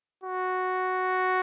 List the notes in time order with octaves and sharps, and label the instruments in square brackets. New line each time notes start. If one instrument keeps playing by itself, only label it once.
[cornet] F#4